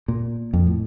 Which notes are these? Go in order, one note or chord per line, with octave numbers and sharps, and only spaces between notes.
A#2
F2
A2